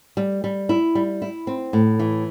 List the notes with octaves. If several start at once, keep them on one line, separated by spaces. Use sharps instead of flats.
G3
G3
E4
G3
E4
C4
A2
E3